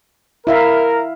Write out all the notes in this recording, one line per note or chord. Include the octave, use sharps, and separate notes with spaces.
E4 A#4 E5 F5